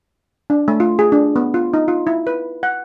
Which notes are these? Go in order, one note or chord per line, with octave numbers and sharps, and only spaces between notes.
D4
A3
F4
G#4
D4
B3
F4
D#4
F4
E4
B4
F#5